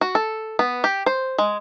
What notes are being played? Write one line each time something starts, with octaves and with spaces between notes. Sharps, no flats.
F#4
A4
B3
G4
C5
G#3